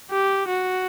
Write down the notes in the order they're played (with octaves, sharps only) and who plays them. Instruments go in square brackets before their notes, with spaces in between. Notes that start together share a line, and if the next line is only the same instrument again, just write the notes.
[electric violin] G4
F#4